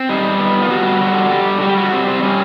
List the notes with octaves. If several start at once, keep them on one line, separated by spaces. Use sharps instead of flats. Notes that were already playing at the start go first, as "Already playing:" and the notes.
Already playing: C4
G3 D#4
B3
F4
G3 F#4
D3 F#4
G3 G4
G3 F#4
G4
F#4
G3 C4
C4
G3 C#4